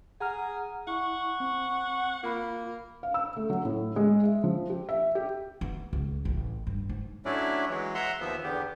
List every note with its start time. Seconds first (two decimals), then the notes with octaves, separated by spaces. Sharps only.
0.20 G#4 F#5 A#5 F6
0.87 E4 F#5 C#6
1.40 C4
2.23 A#3 F4 B5
3.03 F5
3.14 E6
3.36 A3
3.50 F#3
3.65 A2
3.96 G#3
4.24 E5
4.44 F3
4.70 G4
4.89 E5
5.15 G4
5.61 B3
5.93 C#2
6.25 A1
6.67 G2
6.89 G#2
7.25 F#3 A3 C#4 D4 E4 D5
7.69 E3 F#3 G#3
7.95 E5 F#5 A#5 C6
8.21 D#2 F3 B3 E5
8.44 E2 D3 B3 G4